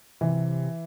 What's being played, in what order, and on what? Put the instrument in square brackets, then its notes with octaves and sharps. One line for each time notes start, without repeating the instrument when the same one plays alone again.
[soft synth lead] C3 [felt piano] E3